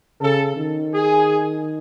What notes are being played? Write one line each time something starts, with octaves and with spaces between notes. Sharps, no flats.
C#3 A4
D#3
G#4